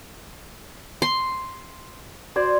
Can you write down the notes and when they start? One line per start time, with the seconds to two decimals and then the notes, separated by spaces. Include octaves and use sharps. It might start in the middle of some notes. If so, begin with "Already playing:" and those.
1.02 C6
2.36 F#4 C5 D5 C6 G#6